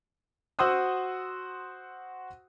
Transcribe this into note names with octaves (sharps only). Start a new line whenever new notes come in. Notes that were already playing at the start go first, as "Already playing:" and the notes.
F#4 C5 F#5 C6 D#6 E6